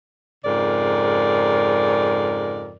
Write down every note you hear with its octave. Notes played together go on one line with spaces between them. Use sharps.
F2 G#2 C#3 A#4 D5